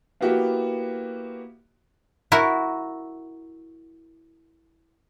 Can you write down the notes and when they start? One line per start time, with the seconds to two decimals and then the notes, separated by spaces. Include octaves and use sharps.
0.21 A#3 B3 E4 F#4 G4
2.32 E4 F#4 A#4